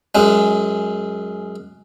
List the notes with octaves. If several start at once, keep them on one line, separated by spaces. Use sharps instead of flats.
F#2 G#3